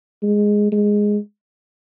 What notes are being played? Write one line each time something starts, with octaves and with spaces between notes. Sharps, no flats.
G#3
G#3